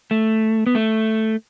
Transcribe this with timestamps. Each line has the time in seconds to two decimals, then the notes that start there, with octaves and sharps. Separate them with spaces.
0.11 A3
0.67 B3
0.75 A3